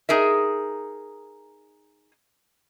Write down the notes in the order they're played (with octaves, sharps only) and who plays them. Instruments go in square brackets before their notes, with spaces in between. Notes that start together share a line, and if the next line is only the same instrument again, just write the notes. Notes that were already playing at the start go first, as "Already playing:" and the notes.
[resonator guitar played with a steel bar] D#4 G#4 A#4 E5